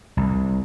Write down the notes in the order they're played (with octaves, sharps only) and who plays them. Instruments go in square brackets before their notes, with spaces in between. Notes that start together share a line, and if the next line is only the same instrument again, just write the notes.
[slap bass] C2